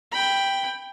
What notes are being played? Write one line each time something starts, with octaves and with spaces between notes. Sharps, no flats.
G5 B5